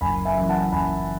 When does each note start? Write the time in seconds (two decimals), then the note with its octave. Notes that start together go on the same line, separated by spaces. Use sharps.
0.01 F#1 G#5 B5
0.25 E5 G#5
0.37 F#2 E3
0.49 F#5 A5
0.72 F#1 G#5 B5